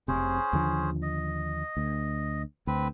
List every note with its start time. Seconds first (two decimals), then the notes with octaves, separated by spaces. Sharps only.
0.08 F1 C3 C#4 G#4 C5
0.53 D#2 D3 F3
1.02 D#5
1.77 D2
2.67 D2 C4 B4